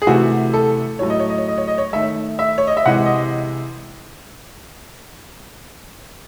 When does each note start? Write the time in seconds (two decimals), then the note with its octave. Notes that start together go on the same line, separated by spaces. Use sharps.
0.02 G#4
0.07 C3 E3 A3 F#4
0.54 A4
0.99 A2 F#3 A3 C#5
1.10 D#5
1.20 C#5
1.29 D#5
1.38 C#5
1.48 D#5
1.58 C#5
1.67 D#5
1.78 C#5
1.93 D#3 A3 E5
2.39 E5
2.58 C#5
2.67 D#5
2.77 E5
2.86 C3 E3 G#3 F#5
3.05 D#5